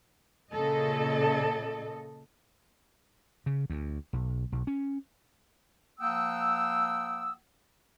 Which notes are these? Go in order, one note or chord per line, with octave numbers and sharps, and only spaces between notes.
A#2 C#3 A4 D#5
C#3
D2
B1
B1
C#4
F3 A#3 F#5 G5 D#6 E6